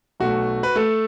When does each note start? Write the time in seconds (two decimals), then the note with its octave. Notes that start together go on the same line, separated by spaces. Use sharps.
0.20 B1 B2 A3 F#4
0.63 B4
0.75 A3 A4